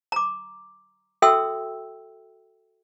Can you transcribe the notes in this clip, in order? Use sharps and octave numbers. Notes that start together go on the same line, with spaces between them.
A#5 D6
F#4 A4 E5 G5 C6 E6